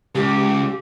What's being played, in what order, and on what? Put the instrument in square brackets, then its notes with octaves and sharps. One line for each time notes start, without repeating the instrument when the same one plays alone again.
[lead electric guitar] C#2 [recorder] G4